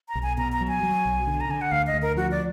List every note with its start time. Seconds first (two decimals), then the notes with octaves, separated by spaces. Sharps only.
0.09 A#5
0.15 B1
0.22 G#5
0.37 B2 A#5
0.52 A#5
0.61 F#3
0.68 G#5
0.83 F#3
1.05 B1
1.27 D3
1.40 A#5
1.49 D3 G#5
1.61 F#5
1.71 D2 F5
1.87 D#5
1.94 D2
2.02 A#4
2.16 F3 F#4
2.31 D5